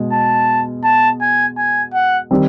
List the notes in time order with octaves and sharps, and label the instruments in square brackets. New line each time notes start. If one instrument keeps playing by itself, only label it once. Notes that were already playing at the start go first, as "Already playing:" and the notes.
Already playing: [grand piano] B2 G#3
[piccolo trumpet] A5
A5
G#5
G#5
F#5
[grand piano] D#3 G3 C4